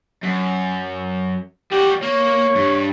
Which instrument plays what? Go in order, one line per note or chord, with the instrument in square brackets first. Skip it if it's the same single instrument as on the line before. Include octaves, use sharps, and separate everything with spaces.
[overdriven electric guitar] F#2
[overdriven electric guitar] G3 F#4 [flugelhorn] G4
[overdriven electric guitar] A#3 [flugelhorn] C#5
[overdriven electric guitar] G2